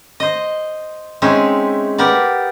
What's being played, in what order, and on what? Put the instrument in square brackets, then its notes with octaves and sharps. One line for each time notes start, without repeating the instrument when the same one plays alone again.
[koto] C5 D#5
G#3 C4 C#4 D#4 E5
B3 G4 A#4 D5